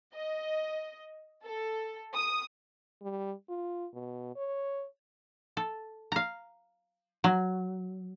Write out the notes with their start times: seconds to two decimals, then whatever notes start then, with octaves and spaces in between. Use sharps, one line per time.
0.14 D#5
1.45 A4
2.14 D#6
3.02 G3
3.49 F4
3.93 B2
4.36 C#5
5.57 A4
6.12 F5 A#5
7.24 F#3